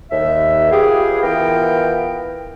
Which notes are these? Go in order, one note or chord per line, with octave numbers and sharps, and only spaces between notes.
D#2 E5
B3 F4 G4 G#4
E3 B3 F4 A#4 G5